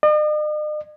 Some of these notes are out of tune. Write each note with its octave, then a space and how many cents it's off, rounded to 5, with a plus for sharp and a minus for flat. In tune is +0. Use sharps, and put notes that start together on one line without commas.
D#5 -45